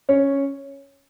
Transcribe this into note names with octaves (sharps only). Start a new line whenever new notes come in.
C#4 C#5